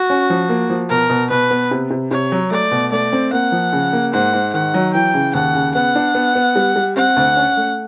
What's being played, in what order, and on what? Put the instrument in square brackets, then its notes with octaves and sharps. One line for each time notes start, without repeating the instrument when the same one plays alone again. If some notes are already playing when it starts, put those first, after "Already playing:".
Already playing: [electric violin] F#4
[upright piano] C#4
F3
A#3
F3
[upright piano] B2 [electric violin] A#4
[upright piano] B2
[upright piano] B2 [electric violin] B4
[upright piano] B3
C3
C3
[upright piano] C3 [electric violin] C#5
[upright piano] F#3
[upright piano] A3 [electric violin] D5
[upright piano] B2
[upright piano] A3 [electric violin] D5
[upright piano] C4
[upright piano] A#3 [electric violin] F#5
[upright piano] F3
C#3
A#3
[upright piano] G#2 [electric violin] F#5
[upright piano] G#2
[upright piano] D#3 [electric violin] F#5
[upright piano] F#3
[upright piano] E3 [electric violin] G5
[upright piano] C#3
[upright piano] D#2 [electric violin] F#5
[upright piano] C#3
[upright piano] B3 [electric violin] F#5
[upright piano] D4
B3
B3
G3
G3
[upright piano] C4 [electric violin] F#5
[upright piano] D2
C#4
A3